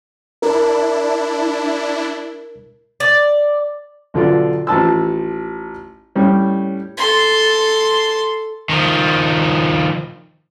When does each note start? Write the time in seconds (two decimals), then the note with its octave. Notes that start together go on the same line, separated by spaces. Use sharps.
0.42 D4 E4 A#4
3.00 D5
4.14 B1 D3 F4 D5
4.67 A1 F3 A5 E6
6.16 A2 G3 C#4
6.97 A4 C6
8.69 D#3 F3